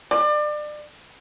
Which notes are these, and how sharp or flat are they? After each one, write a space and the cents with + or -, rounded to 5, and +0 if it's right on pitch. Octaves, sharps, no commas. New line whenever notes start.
D5 +30